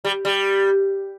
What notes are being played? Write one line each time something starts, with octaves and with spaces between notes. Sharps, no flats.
G3
G3